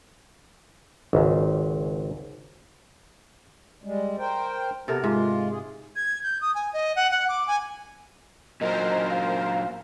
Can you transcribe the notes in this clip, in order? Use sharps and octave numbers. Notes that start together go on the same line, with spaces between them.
G#1 C#2 G#2
G3 G#3
A#4 C5 G5
C3 B3 F#4 A4 A#4
G#2 G#3 F4
G#4
G#6
G6
D#6
G#5
D#5
F#5
F#5
D6
G#5
A#2 F#3 A#4 C5 D#5
F5